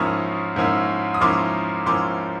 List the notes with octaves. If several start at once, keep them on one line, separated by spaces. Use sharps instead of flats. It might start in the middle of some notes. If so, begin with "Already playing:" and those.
Already playing: G#2 F3 A#3 C#4 E4 C#6 D#6
G#2 F3 A#3 C#4 E4
D#6
G#2 F3 A#3 C#4 E4 C6 D6
G#2 F3 A#3 C#4 E4 C6 D6